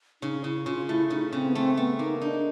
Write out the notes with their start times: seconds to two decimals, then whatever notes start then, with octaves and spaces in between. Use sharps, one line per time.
0.22 C#3 D#4
0.44 C#3 E4
0.66 C#3 F4
0.88 A3 E4
1.10 C#3 D#4
1.32 C#3 C4
1.49 B3
1.55 A3 C4
1.77 A3 B3
1.99 A#3 D#4
2.21 D4 D#4